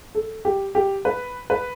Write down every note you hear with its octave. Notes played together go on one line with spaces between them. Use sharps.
A4
G4
G4
B4
B4